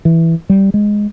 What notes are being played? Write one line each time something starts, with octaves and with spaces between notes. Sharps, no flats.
E3
G3
G#3